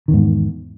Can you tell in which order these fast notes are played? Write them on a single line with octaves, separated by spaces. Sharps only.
D#3 E2 G#2